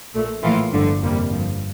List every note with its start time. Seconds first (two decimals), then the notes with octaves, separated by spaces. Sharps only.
0.14 A#1 A#2 A3
0.43 A2 E3 A#3 F4
0.72 G1 G2 D3 F3 A3
1.01 F2 C3 G3 A#3
1.30 G1 G2 F3